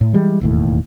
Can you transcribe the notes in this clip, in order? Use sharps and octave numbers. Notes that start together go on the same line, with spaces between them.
A2
E3 G3 G#3
E1 D#2 A2